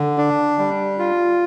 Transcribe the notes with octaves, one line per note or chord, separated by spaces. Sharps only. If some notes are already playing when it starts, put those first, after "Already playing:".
Already playing: D3
D4
G3
F4